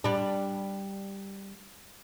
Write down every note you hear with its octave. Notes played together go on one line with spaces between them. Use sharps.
G3 D4